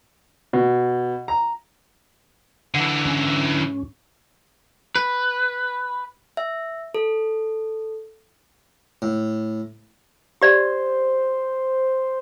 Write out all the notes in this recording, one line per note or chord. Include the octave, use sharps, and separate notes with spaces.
B2
A#5
D3 E3
G#2 C#4
B4
E5
A4
A2
G4 C5 D5